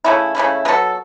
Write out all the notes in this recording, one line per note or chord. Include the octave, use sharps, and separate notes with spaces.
C#3 A3 C#4 E4
C#3 A3 C#4 E4
F#3 B3 F#4 A4